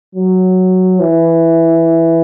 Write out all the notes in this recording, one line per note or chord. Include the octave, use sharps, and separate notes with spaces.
F#3
E3